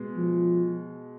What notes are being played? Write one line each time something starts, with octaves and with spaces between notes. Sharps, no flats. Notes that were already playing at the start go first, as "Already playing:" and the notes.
Already playing: B2 G#3 B3
F3